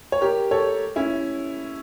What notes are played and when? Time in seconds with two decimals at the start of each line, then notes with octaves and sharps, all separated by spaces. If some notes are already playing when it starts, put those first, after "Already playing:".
0.12 C#5
0.21 G4 A#4
0.51 A4 C#5
0.96 C#4 E4